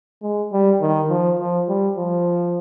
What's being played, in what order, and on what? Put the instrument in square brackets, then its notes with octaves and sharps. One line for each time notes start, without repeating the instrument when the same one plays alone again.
[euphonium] G#3
G3
D#3
F3
F3
G3
F3